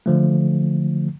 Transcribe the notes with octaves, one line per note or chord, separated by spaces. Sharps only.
D3 F3 A3